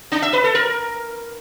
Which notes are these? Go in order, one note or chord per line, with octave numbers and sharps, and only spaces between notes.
D4
E5
B4
A4
A#4